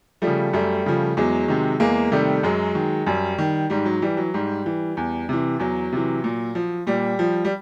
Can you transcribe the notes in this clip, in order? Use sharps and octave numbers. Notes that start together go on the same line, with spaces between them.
F3 G3 A3
C#3
F#2 G3 A3
C#3 F3
E2 F#3 G#3
C3 D#3
E2 G#3 A#3
C3 D#3 G3 A3
F#2 F#3 G#3
D#3
F#2 G3
D#3
G#2 G3
F#3
E3 G3
F#3
G#2 G3
E3
E2
C3 E3
E2 F#3
C3 E3
A#2
F3
A#2 G3
F3
G3